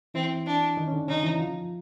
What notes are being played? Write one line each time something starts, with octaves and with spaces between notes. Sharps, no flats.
E3 C4 E4
D4
D#3 D#4
C#4
D3 D4
C#3 C#4 D#4
E3 E4
F3 F4